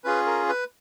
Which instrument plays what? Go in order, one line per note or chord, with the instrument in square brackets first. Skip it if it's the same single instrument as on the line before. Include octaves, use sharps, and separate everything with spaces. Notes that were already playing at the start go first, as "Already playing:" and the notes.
[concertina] C#4 F4 G#4 B4
A#4
B4